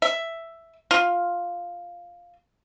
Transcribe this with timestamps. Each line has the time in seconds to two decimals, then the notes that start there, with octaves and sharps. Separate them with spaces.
0.02 E5
0.91 F4